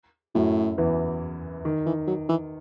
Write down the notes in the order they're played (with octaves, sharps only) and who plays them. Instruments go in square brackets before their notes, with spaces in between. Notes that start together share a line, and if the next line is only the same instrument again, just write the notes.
[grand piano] F#2 F#3 [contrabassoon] A2
[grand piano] E2 E3
D#3
[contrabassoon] E3
F#3
E3